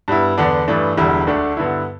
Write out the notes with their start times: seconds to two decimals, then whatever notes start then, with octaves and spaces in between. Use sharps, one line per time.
0.08 G2 G3 B3 E4
0.38 E2 D3 B3 D4
0.68 G2 E3 A3 D4
0.97 E1 E2 D3 G3 E4
1.27 D2 D3 A3 D4
1.57 G2 D3 B3 E4